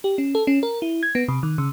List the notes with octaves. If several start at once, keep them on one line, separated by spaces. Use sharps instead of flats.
G4
C#4
A4
C#4
A#4
E4
G#6
B3
C3
D#3
C#3